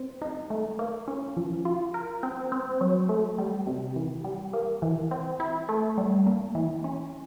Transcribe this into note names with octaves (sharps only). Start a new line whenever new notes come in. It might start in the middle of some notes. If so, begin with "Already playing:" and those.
Already playing: C4
D#4
A3
A#3
C#4
F3
F4
A#4
C4
C4
F#3
A3
G3
C3
E3
G3
A#3
E3
C4
E4
A3
G3
A#3
E3
C#4